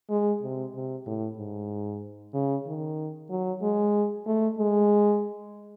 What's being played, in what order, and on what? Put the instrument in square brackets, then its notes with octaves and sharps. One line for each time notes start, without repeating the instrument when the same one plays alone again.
[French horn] G#3
C3
C3
A2
G#2
C#3
D#3
F#3
G#3
A3
G#3